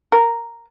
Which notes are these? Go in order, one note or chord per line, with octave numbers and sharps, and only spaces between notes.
A#4